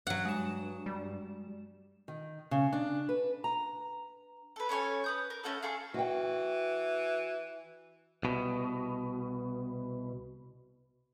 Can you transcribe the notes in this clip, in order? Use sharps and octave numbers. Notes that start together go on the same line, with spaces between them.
G2 F#3 F#5
G#3 E7
G3
D#3
C#3
D4
B4
A#5
A4 B4
C#4 A4 C#5 G#5
B4 D#6 G6
A#4
A3 C#4 F#4 A4
F4 G#4 A4 C#6
E3 F#4 G5
C2 B2